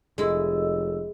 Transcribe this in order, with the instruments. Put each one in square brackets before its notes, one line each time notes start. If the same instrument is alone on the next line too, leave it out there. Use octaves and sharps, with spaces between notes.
[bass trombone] F1 [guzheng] G#3 E4 [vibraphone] A4 D#5 E6